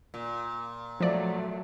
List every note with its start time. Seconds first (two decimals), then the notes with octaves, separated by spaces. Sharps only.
0.14 A#2
1.00 F3 F#3 A3 D5